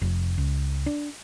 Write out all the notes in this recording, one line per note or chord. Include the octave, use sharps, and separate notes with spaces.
F1
C#2
D4